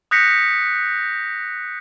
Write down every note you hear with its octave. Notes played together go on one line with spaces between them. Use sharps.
D#6 F#6 G6 A#6 B6 C#7